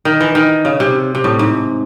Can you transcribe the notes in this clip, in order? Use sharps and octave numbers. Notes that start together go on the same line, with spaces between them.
D#3
E3
D#3
C#3
C3
C3
A2
G#2